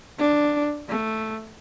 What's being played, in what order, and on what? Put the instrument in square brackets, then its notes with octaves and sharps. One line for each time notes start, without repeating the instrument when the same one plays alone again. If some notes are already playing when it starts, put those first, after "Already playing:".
[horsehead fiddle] D4
A3